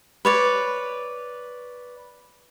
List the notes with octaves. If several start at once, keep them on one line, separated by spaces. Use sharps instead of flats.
B4 C#5 D5